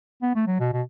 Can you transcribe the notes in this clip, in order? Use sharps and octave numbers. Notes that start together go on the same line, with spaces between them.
B3
A3
F#3
B2
B2